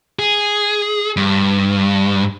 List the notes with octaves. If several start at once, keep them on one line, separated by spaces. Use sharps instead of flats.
G#4
G2